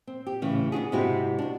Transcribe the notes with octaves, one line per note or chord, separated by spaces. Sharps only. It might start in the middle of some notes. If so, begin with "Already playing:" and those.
C4
G4
A2 C#3 E3
B3 D4 F#4 G#4
G#2 C3 C4 E4 F#4 G4
D4 F#4